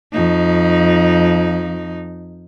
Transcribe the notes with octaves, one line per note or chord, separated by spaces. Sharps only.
F2 D#4